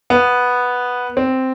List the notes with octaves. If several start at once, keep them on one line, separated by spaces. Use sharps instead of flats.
B3
C4